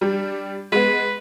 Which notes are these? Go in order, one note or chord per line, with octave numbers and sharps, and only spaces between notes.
G3 D4
G#3 B3 B4